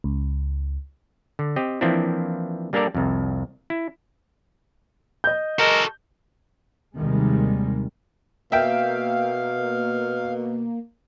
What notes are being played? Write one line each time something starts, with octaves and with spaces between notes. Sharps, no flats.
C#2
D3
C4 G4 D#5
E3 F3 A#3 C4 D4 E4
G3 A#3 D4 A4 A#4 D5
C2 F2
E4
D#5 G6
G#3 F#4 A4 A#4
D#2 C3 D#3 G3 G#3
B2 A#3 E5 F5 G5